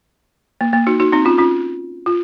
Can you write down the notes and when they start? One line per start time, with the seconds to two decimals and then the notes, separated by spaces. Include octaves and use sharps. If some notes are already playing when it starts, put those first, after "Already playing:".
0.61 A#3
0.73 A#3
0.87 D#4 F#4
1.00 D#4 F#4
1.12 C4 D#4
1.25 C#4 F4
1.38 C#4 F4
2.06 F4